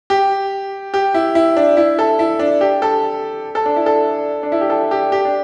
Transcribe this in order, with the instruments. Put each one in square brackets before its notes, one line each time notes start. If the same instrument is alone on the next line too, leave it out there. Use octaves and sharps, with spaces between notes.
[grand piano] G4
G4
E4
E4
D4
E4
A4
E4
D4
G4
A4
A4
D4
E4
A4
D4
E4
G4
A4
G4
G4
D4